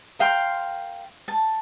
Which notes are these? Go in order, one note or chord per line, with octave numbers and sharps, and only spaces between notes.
A#4 F5 G5 C6
A5